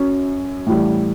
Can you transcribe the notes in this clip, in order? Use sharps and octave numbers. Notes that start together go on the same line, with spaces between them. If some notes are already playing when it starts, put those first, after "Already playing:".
Already playing: F#2 C#4
A2 E3 G3